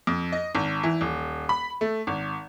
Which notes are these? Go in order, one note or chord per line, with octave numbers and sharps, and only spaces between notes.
F2
D#5
G#1
E3
D#1
B5
A3
G#1